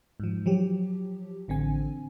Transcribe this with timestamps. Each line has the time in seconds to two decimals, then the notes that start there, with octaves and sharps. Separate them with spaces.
0.20 G#2 F3
0.46 F3 F#3 G4
1.48 A1 D3 C4 G#5